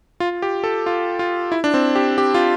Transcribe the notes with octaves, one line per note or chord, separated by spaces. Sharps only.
F4
G4
A4
F4
F4
E4
D4
C4
G4
G4
F4